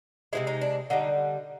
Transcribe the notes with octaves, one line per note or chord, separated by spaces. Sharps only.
C3 E3 G#3 E4
D#4
D4
D3 G3 D#4